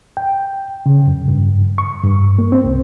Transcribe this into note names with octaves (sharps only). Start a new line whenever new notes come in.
G5
C#3
F#2
G2
C#6
G2
A#3
C4
C2